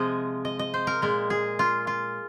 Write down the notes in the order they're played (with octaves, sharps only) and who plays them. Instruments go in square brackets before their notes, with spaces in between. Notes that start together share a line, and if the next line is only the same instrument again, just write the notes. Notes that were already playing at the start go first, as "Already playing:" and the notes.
Already playing: [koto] C3 F3 G#3 D#5
D#5
D#5
C5
A#4
A#2 G#3 A#4
G#4
F4
F4